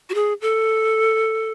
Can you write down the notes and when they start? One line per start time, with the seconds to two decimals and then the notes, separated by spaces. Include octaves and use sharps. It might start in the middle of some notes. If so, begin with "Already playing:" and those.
0.10 F#4
0.14 G#4
0.42 A4